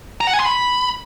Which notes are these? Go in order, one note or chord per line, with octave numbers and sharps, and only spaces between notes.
A#5
F#5
G#5
C6
B5